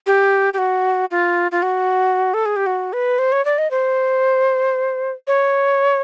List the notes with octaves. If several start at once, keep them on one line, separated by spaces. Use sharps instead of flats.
G4
G4
F#4
F4
F4
F#4
A4
G#4
G4
F#4
B4
C5
C#5
D5
D#5
C5
C#5